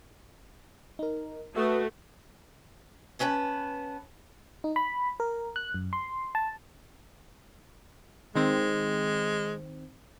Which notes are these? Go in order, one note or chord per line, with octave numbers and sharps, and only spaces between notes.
D#4 A#4
A3 F#4 B4 E5 D#6
B3 C#4 B4 G#5 A5
D#4
B5
A#4
F#6
F#2
C6
A5
D#3 G#3 C4